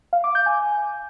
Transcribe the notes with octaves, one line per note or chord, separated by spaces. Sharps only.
F5
D6
G6
G#5